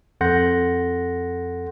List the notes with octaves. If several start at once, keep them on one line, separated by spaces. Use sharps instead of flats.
F2 A4 F#5 C6 G6 A#6